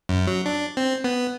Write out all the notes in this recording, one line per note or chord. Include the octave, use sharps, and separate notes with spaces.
F#2
F#3
D4
C4
B3